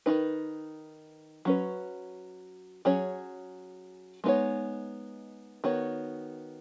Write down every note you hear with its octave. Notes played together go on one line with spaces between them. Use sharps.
D#3 F#3 D#4 B4
F#3 C#4 B4
F#3 C#4 G#4 C#5
G#3 B3 D#4 F#4 C#5
D#3 B3 F#4 C#5